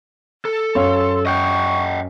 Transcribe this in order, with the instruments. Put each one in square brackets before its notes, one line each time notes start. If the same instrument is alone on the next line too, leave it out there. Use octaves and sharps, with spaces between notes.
[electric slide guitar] A4
[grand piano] F#2 [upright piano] C#5 F5 [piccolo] C6
[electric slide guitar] D#5 F#5 G5 [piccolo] C#6